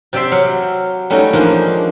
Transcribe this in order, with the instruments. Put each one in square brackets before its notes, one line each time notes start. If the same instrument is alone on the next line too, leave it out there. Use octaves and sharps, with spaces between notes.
[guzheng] C3 G4 D5 E5 C6
F#3 F5 F#5
G3 A3 C#4 D#4 F#4
F3 G#3 A#3 D4 D#4